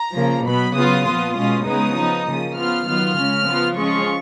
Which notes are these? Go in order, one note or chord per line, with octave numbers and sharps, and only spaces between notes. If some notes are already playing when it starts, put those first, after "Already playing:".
Already playing: A#5
C#3 F3 A#3
B2 F#3 B3 B5
C#3 F#3 B3 F4 D#6
A#2 F3 B3 F4
B2 G#3 C#4 F4 D#6
C#3 G#3 B3 D#4 D#6
F3 B3 D#4
C#3 F3 A#3 D#6
F3 B3 F4 F6
D#3 F#3 B3 F4 F6
C#3 G#3 C#4
F3 B3 F4
F3 G#3 C#4 F4 C#6